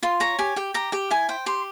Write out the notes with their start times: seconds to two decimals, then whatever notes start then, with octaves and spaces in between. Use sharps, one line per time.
0.03 F4 C6
0.20 C#5 A#5
0.39 G4 G#5
0.56 G4 G5
0.74 G4 A#5
0.92 G4 G5
1.10 E4 G#5
1.29 C5 G5
1.46 G4 C6